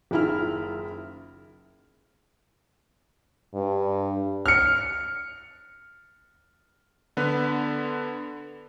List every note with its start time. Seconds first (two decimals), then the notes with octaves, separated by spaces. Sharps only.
0.11 F#1 D#3 E4 F4 F6
3.55 G2
4.46 F6 C#7
7.17 D3 B3 B4